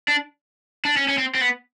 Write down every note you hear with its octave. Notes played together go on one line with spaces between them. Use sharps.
D4
D4
C#4
C#4
C4
C4
B3